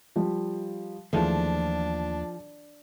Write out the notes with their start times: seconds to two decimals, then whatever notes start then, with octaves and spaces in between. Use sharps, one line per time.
0.16 F3 G3
1.13 D#2 E3 F3 A3 D4 F4 G#4